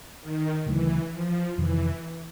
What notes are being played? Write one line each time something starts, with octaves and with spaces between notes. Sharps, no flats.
D#3
D2 C#3 E3 F#3 A3
F3
F2 C3 D#3 E3